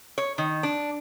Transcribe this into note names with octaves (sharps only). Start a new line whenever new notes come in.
C#5
D#3
D4